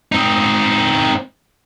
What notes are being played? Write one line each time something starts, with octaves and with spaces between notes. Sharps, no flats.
C4 D#4